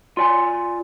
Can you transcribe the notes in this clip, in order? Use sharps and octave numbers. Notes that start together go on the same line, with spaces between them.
F4 D5 G#5 C6